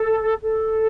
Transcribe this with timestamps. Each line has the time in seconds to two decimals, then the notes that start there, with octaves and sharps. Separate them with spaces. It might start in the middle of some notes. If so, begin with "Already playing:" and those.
Already playing: A4
0.43 A4